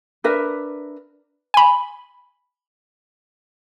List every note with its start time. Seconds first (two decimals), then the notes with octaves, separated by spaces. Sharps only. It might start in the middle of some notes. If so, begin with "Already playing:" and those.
0.24 D4 A#4 B4 E5
1.54 G#5 B5